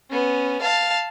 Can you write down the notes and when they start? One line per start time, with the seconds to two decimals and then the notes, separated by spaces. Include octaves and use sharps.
0.11 B3 C#4
0.61 F5 A5